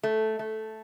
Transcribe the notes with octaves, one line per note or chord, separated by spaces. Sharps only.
A3
A3